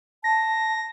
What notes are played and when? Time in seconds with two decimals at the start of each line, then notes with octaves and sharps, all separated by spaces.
0.24 A5 A#6